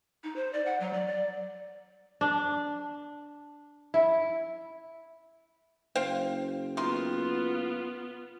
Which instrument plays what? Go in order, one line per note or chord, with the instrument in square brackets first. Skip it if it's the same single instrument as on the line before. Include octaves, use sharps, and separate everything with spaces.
[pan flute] D#4
C5
D5
F#5
F#3
D5
D5
[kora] D4
E4
[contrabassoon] F#1 [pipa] C5 F5 G5
[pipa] D#3 C6 [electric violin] B3 F4